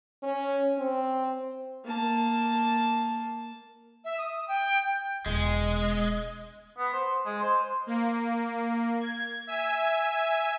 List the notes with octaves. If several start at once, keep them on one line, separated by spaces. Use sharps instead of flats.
C#4
C4
A#3 A5
E5
D#6
G5
E1 G#3
B3
C5
G#3
C5
A#3
G#6
E5 G#5